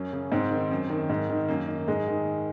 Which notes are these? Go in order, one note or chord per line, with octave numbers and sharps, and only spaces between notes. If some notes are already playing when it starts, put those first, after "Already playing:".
Already playing: F#2 C#4
C#3
G#2 C4
D#3
F#2
D#3
G#2
D#3
F#2 A#3
D#3
G#2 G#3
D#3